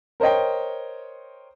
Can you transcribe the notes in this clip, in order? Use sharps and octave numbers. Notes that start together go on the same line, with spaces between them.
A#4 C5 C#5 D#5 G5